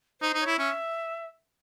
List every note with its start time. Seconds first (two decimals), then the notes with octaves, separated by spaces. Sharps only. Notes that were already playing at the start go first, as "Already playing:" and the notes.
0.21 D#4 C5
0.34 D#4
0.41 C#5
0.46 E4
0.58 C#4 E5